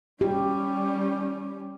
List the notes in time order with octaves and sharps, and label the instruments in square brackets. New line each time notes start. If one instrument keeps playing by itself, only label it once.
[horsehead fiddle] G3 C#4 [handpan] G4